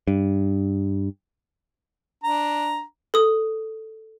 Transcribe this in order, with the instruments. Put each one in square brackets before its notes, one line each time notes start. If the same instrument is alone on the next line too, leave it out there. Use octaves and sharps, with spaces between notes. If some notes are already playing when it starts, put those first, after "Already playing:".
[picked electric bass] G2
[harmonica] D4 A#5
[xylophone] A4 D#6